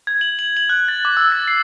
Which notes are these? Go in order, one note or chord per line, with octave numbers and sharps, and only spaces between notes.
G#6
F#7
F#7
F#7
F#6
A6
D6
E6
A6
C7